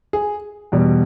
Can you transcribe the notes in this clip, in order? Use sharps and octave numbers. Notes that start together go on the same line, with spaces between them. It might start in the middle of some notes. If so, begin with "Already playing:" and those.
G#4
E2 B2 G3